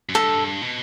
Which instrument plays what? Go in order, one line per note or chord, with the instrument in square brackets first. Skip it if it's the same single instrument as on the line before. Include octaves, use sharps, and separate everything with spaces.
[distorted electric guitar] F#2
[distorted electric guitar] G2 [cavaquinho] A4
[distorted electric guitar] B2